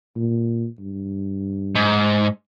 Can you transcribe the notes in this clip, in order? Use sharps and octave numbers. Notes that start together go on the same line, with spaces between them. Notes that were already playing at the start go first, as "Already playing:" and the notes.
A#2
G2
G#2